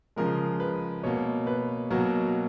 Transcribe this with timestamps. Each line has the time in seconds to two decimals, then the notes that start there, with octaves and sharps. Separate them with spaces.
0.16 C#3 F3 G#3 A#4
0.60 B4
1.03 B2 A#3 C#5
1.47 B4
1.90 B2 F#3 A#3 A#4